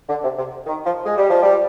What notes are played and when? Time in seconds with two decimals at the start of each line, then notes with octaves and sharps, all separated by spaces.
0.09 D3
0.23 C3
0.37 C3
0.66 D#3
0.85 F3
1.05 G#3
1.18 G3
1.29 F3
1.43 G3